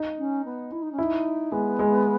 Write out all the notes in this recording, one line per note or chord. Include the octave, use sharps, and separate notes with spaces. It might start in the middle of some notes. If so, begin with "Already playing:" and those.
Already playing: D#4
C#4
B3
E4
D#4
C#4
D#4 E4
G#3 B3
G#3